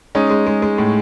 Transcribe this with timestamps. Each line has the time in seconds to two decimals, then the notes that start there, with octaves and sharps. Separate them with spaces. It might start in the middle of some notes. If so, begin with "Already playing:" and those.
0.15 G#3 C#4 D#4
0.30 G#3
0.46 G#3
0.62 G#3
0.78 A2